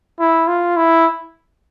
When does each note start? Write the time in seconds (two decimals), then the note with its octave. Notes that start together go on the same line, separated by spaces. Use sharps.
0.19 E4
0.48 F4
0.77 E4